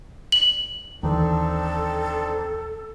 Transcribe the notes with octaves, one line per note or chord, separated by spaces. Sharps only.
F#7
D#2 E3 C4 D4 D#4 A4